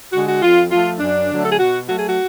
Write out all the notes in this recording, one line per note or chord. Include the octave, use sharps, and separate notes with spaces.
D3 G#3 F#4
F#4
F2 F4
F3 A3 F4
F#2 D4
D3 F#3 A3
A4
G#4
B2 F#4
F#3 A3 F#4
G#4
F#4